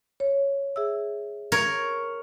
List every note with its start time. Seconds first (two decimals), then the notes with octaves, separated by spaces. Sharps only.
0.20 C#5
0.76 G#4 E5 E6
1.52 A#4 C#5